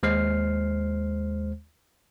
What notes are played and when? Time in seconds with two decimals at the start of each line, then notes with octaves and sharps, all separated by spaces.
0.03 D#2 G#3 C5 F6 C7